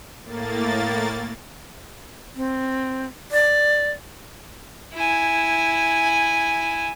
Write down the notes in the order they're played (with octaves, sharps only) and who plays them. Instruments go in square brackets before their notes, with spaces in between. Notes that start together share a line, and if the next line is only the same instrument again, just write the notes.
[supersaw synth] A2 A#3 A6
[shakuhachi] C4
D5
[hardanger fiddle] E4 G#5